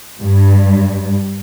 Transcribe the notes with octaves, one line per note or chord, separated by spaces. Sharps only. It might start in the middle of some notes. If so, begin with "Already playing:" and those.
G2